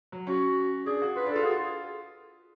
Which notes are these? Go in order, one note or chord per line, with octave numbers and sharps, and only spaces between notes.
F#3
C#4 F#4
D4 G#4
F#4
F4 B4
D4
F4 A4
F#4 G#4
F4